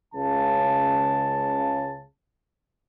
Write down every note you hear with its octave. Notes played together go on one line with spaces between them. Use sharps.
C#2 C#3 A5